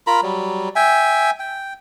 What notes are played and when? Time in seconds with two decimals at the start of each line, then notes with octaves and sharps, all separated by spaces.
0.07 F4 A#4 A#5 B5
0.23 F#3 G3
0.76 E5 G5 G#5
1.39 G5